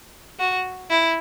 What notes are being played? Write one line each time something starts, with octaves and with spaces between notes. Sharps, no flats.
F#4
E4